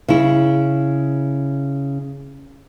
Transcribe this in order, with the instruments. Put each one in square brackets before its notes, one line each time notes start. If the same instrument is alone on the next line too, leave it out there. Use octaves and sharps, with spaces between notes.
[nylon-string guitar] C#3 E4